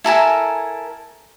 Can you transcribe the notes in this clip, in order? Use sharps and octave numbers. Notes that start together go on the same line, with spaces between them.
E4 A4 A#4 G#5